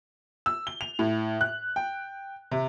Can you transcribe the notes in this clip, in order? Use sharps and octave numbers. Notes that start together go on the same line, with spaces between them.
E6
G7
F7
A2
F#6
G5
C3